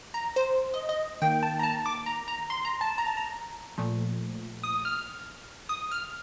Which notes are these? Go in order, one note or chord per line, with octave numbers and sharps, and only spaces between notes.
A#5
C5
D#5
D#5
D#3 A#3 G5
A5
A#5
A5
D6
A#5
A#5
C6
A#5
A5
A#5
A5
A#5
A#2 F3 A3
D#6
F6
D#6
F6